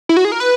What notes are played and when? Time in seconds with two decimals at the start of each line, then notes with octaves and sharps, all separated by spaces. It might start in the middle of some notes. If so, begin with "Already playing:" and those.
0.09 E4
0.17 F#4
0.25 G#4
0.32 A#4
0.40 B4